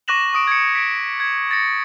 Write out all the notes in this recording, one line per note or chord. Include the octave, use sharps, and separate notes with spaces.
C#6 D6 F#6 A#6 E7 F#7
C#6 D#6 D7
G#6 C#7
B6 D7
G#6
A6 A#6 C#7